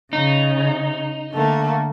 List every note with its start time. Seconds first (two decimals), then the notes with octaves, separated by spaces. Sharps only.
0.13 C#3 D#4
1.32 D3 A3 A#3